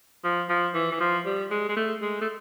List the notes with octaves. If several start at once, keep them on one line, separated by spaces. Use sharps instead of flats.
F3
F3
E3
E3
F3
G3
G#3
G#3
A3
G#3
A3